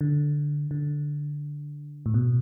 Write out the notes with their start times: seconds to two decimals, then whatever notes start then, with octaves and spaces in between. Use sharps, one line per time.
0.01 D3
0.71 D3
2.06 A2
2.14 B2